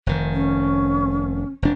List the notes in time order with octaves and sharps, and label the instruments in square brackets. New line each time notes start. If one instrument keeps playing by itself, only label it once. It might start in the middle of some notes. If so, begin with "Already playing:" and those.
[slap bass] F1 D#3
[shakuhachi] C#4
[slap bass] F1 D4